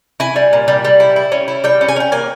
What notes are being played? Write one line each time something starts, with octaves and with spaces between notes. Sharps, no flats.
E4 G#5
G3
A#2
G3
G3
E4
E4
C#4
E4
G3 G5
C#4
G#5
C#4 G5
A#3 G#5